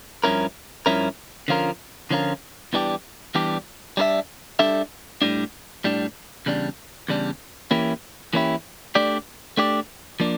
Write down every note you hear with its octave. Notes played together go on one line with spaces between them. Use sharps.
G2 F3 C#4 E4 A#4
G2 F3 C#4 E4 A#4
D3 F3 C#4 F4 A#4
D3 F3 C#4 F4 A#4
E2 E3 G3 D4 G4
E2 E3 G3 D4 G4
G3 D4 A4 E5
G3 D4 A4 E5
A2 G3 D4
A2 G3 D4
E2 C#3 G3 D4
E2 C#3 G3 D4
E3 A#3 C#4 E4 G4
E3 A#3 C#4 E4 G4
A3 D4 G4 D5
A3 D4 G4 D5
F3 A#3 D4